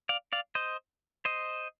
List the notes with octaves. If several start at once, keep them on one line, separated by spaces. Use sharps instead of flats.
D5 F5
D5 F5
C5 D#5
C5 D#5